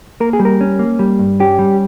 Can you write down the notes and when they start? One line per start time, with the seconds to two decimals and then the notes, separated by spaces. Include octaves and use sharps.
0.20 A#3 A#4
0.33 G#4
0.40 G3
0.45 A#4
0.61 C#4
0.79 A#3
0.99 G3
1.19 G2
1.40 C#4 G4
1.59 G3